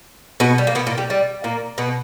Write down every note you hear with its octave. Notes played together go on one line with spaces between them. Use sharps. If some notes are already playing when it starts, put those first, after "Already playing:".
B2 B3
G3
A#3
B2 B3
A#2 A#3
G3
G3
A#2 A#3
B2 B3